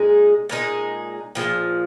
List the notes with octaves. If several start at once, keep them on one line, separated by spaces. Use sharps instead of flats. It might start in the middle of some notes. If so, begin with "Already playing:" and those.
Already playing: A#2 G#3 D#4 G#4
A#2 G#3 D#4 G#4
A#2 F3 G#3